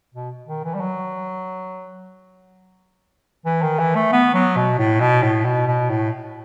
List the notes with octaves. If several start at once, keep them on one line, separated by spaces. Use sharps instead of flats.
B2
D#3
E3
G3
F#3
E3
D#3
E3
A3
B3
F#3
B2
A2
B2
A2
B2
B2
A2